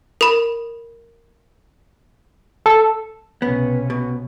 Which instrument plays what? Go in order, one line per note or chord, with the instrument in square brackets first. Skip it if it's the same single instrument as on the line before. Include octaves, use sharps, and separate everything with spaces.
[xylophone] A#4 B5
[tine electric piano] A4
[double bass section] B1 C3 C#4 [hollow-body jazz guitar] B3
[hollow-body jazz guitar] B2